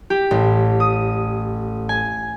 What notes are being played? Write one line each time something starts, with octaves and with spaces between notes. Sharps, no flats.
G4
A1
D#6
G#5